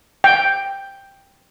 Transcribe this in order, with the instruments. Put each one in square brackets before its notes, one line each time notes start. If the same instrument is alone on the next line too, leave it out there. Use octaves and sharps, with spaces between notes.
[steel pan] G5